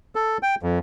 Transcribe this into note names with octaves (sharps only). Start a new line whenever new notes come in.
A4
G5
F2